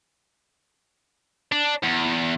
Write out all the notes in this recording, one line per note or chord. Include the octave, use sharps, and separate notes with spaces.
D4
E2